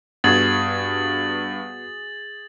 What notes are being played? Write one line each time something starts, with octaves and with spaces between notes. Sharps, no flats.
G2 B3 F#4 G#4 A6 F#7